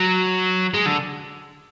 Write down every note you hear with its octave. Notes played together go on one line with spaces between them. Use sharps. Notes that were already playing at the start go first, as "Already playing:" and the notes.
Already playing: F#3
G#3
D3